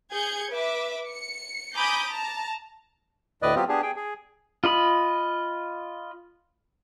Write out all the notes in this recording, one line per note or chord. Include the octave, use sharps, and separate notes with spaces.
G#4 G6 G#6 C#7
B4 E5 D6
C#7
G#5 A#5 B5 D6 D#6 G6
A5 A#5
D2 A2 B4 D5 D#5
F#3 B3 C4 F4 G4
B3 D4 G4 G#4
G#4 G5
G#4
F4 D#5 B5